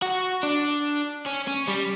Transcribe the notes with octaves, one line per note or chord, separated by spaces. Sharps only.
F#4
D4
C#4
C#4
G3